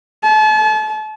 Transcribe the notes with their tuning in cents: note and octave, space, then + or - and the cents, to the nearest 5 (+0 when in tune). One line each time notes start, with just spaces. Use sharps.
A5 -40